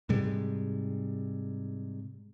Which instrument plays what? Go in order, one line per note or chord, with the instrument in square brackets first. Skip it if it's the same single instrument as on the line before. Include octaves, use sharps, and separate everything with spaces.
[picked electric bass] G#2 C3 G3 G#3